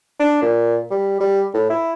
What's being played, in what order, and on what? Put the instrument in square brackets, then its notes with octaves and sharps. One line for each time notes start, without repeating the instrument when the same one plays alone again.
[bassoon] D4
A#2
G3
G3
A2
E4